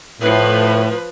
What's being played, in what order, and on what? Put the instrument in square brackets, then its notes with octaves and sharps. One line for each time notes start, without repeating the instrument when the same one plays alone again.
[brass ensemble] A2 [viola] F3 B4